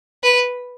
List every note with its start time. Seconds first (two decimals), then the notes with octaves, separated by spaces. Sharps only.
0.24 B4